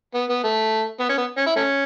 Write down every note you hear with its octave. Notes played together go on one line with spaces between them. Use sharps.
B3
B3
A3
B3
C#4
B3
C#4
E4
A3 C#4